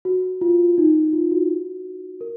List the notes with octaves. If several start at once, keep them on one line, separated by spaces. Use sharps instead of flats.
F#4
F4
D#4
F4
F#4
A#4